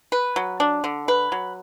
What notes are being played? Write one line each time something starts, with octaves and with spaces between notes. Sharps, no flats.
B4
F#3
D4
D3
B4
F#3